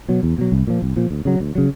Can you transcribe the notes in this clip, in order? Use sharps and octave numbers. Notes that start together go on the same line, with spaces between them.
B2 F#3
E2
B2 F#3
C2
A#2 F3
C2
A#2 F3
D2
C#3 F#3
D2
C#3 F#3